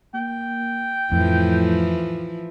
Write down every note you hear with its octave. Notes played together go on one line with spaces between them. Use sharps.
A#3 G5
F2 A2 E3 F3